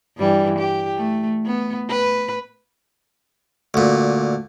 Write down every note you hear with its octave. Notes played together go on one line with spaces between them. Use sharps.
G2 E3 G3
G4
A3
B3
B4
D2 A#2